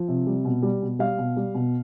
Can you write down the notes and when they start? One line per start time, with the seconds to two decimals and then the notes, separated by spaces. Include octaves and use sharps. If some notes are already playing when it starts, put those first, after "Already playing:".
Already playing: F3
0.08 C3
0.27 G3
0.45 B2
0.63 G3
0.82 B2
0.99 G3 F5
1.18 B2
1.37 G3
1.55 B2